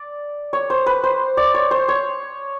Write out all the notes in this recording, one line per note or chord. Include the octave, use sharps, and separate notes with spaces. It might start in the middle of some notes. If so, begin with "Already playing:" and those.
Already playing: D5
C#5
C5
B4
C5
D5
C#5
C5
C#5